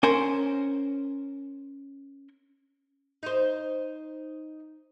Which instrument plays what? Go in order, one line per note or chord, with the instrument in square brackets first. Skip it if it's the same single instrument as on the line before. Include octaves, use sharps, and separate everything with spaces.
[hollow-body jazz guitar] C#4 A#4 C5 G#5
[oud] D#4 C5